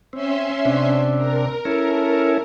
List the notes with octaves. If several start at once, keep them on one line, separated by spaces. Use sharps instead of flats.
C4 C#4 E5 C6
C3 C4 D4
A#4
C#4 E4 A4